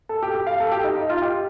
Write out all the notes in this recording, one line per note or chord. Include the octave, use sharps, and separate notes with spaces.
A4
G4
G4
F5
A4
G4
D#4
D#4
F4
G4